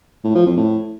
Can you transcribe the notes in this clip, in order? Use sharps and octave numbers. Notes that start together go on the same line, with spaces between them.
A2
F3
F2
A2